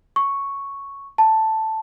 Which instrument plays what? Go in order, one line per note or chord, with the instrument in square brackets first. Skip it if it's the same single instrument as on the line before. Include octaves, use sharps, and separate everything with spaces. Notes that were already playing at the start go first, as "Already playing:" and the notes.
[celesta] C#6
A5